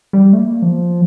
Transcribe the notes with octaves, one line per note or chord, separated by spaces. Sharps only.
G3
A3
A#3
F3